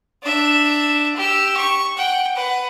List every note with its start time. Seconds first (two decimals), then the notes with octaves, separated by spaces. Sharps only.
0.23 D4 E5
1.16 G4 E6
1.57 C#6
1.97 F#5 G5
2.36 B4 F#5